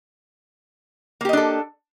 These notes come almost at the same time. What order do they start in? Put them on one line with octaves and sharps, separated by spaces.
A#3 G4 D#5 D4 A4